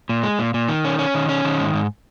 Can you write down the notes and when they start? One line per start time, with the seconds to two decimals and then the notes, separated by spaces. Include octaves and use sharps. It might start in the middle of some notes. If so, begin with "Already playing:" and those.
0.09 A#2
0.23 G#3
0.39 A#2
0.54 A#2
0.68 D#3
0.85 C#4
0.99 C#4
1.14 D#3
1.29 C#4
1.44 D#3
1.59 G#2
1.74 G#2